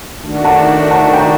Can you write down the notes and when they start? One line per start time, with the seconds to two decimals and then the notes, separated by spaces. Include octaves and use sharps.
0.22 D#3 A3 D4 F#4
0.44 F#5 A5
0.91 F#5 A5
1.13 G5 A#5